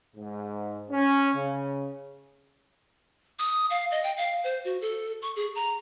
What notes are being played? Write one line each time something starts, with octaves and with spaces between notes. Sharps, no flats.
G#2
C#4
C#3
D#6
F5
D#5
G5
F5
C5
F#4
A4
C#6
G#4
A#5